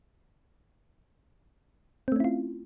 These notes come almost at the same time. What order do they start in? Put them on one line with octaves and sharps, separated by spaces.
C4 A3 C#4 E4 F4